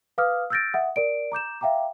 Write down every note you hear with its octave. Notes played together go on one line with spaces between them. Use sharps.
B4 F5 D6 D#6 F6
E6 F6 G6 A6 A#6 D7
E5 F#5 D#6
A#4 D5 D7
A#5 D6 G6 E7
E5 F5 G5 A#5 D6